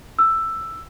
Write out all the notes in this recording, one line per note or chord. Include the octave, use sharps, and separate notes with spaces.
E6